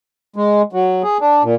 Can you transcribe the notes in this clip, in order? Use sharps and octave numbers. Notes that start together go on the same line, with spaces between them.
G#3
F#3
G#4
D4
A#2